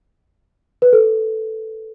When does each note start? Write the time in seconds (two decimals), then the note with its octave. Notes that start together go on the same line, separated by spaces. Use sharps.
0.82 B4
0.93 A4